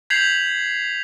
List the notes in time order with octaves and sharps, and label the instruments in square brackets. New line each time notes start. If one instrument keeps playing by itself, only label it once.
[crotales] G6 G#6 B6 C7 F7 F#7